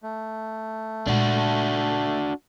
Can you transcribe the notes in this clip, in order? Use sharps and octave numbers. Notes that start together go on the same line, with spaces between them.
A3
A#2 G#3 D4 F#4